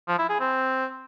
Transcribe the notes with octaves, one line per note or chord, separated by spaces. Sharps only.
F3
E4
G#4
C4